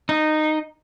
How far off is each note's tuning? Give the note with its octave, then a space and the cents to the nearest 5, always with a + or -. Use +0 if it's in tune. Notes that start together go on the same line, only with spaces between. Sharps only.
D#4 -15